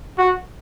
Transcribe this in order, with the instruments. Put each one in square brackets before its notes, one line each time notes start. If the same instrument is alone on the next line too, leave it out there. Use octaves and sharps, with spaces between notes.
[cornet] F#4